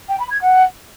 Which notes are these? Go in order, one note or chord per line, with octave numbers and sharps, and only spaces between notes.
G5
B5
G#6
F#5